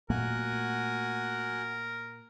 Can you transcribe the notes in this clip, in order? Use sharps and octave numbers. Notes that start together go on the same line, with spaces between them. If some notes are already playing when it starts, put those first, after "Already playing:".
A#2 F#3 A3 B3 F#4 A#4 G#5 F#6